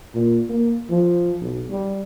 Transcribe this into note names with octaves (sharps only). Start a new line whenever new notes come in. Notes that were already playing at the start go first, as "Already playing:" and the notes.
A#2
A#3
F3
B1
G3